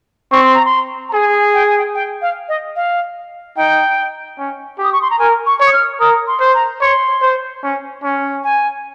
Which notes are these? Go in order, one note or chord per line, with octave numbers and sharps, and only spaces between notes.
C4 C#6
C6
A#5
C6
A#5
G#4 G#5
G5
G#5
G5
G5
F5
D#5
F5
D#4 G5
C#4
G4
D#6
C#6
C6
A#5
A#4 G#5
C#6
C#5
D#6
F6
A#4 D#6
C6
C5
A#5
C#5 C6
C5
C#4
C#4
G#5